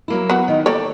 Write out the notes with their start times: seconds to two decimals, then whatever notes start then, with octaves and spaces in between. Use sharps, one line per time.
0.08 F#3 A#3 E4
0.30 B3 F#4
0.48 D#3 D#4
0.66 A#3 A4 C#5 D5 G5